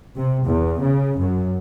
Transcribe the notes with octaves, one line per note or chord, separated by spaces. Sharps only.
C3
E2
C#3
F#2